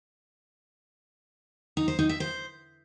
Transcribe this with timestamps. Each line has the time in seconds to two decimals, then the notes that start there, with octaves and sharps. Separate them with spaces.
1.77 D#4
1.88 C5
1.99 D#4
2.09 E5
2.20 C5